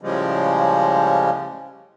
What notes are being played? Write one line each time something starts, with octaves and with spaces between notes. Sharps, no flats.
A2 C#3 F3 G3 G#3